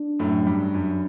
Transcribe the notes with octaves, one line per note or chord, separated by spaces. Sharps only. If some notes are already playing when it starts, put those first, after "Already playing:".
Already playing: D4
F#2 A2
G2
F#2